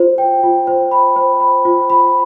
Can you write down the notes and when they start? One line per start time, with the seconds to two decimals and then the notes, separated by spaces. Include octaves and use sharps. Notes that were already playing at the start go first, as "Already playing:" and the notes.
Already playing: F4 C5
0.18 G5
0.43 F4
0.67 C5
0.91 B5
1.16 C5
1.40 B5
1.65 F4
1.90 B5